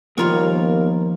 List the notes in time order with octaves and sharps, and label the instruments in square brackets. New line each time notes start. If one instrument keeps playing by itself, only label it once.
[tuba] D#2 [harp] F3 [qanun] G3 F4 C#6 [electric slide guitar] B3 A#4 A#5